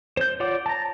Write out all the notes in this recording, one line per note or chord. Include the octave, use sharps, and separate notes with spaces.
C5 G6
F4 C#5 D5 F#5 D6
A5 A#5